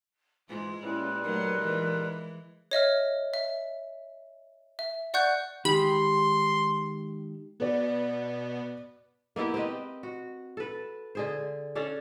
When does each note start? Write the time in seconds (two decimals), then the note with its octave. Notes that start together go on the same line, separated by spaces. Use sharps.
0.49 G#2 E3 G#3 F4
0.82 A#2 G3 C#4 E4 B4
1.24 F#3 A3 D#4 A4 A#4
1.59 E3 G#3
2.71 C#5 D#5 E5 F6
3.34 E5
4.79 E5
5.14 D5 F#5 C#6 F#6 G6
5.65 D#3 G#3 G4 B5 C6
7.60 B2 B3 B4 D5
9.36 A#3 B3 E4 G4
9.54 C4 G4 B4 D#5
10.03 F#4
10.57 A4 B4
11.15 D3 G#4 C5
11.75 C#4 D4 A4 F5